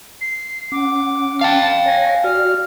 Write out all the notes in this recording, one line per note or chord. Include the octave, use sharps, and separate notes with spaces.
C7
C#4 F#5 D6
F5 G5 A5
C#5 G#5 A#6
F#4 D5 F6